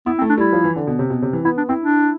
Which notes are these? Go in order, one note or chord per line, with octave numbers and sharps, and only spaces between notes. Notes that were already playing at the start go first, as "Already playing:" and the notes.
B3 E4
C4
A3
D4
G3 E4
F3
E3
D3
B2
C3
B2
C3
E3
B3 E4
D4
C4 E4
D4